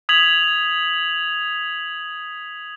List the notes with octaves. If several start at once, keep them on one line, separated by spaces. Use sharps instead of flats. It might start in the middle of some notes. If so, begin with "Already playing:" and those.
D#6 G#6 B6 F7 F#7